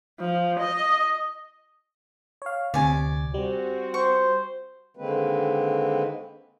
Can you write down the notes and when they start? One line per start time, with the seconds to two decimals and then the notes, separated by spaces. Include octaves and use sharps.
0.20 F3
0.59 D#5
2.42 C#5 F5
2.74 D2 C3 D5 G#5
3.34 G3 C4 F#4
3.94 C5 C#6
4.97 D3 D#3 G#3 A#3 C4 B4